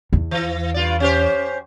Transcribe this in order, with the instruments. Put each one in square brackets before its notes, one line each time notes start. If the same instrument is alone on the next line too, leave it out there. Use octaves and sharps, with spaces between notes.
[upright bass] E2
[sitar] E3
G2 F4 D5
C#4 G4 C5